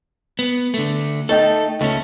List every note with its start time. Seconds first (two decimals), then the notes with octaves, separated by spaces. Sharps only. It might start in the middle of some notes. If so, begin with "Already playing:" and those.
0.39 B3
0.74 D3 A3
1.29 A3 D#4 A4 G5
1.81 C#2 A3 C#4